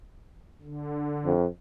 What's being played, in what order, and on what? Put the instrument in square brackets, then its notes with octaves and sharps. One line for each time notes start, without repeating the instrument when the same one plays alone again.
[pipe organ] D3
[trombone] F2